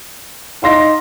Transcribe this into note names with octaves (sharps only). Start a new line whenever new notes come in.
D#4 F5 C6 A#6